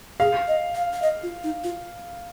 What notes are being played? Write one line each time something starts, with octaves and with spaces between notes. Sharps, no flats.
G#4 F5
D#5
F5
F5
D#5
F4
D#4
F4